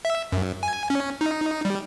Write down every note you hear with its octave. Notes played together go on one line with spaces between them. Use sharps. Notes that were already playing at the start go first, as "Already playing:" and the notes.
E5
F#2
G#5
C#4
D#4
G3